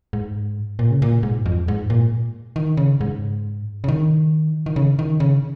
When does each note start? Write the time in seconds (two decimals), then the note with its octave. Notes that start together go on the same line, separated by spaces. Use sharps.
0.13 G#2
0.79 A#2
0.91 C#3
1.02 A#2
1.23 G#2
1.46 F2
1.68 G#2
1.90 A#2
2.56 D#3
2.77 C#3
3.01 G#2
3.84 C#3
3.88 D#3
4.66 D#3
4.76 C#3
4.99 D#3
5.20 C#3